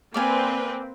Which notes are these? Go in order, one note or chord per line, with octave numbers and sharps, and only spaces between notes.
A#3 C4 B4 D5 F5 G#5